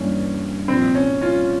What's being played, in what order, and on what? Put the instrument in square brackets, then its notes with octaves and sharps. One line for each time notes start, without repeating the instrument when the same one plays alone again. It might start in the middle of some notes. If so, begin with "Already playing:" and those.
Already playing: [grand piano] G2 E3 A#3 [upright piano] C#4
[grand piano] C2 A#2 F3 [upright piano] C4
[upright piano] C#4
C#4 F4